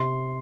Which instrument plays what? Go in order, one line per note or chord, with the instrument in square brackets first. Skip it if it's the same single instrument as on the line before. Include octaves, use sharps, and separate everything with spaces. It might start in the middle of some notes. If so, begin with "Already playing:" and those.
Already playing: [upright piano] C3 C6